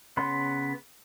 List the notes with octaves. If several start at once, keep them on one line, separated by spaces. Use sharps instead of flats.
C#3 B3 B5 C6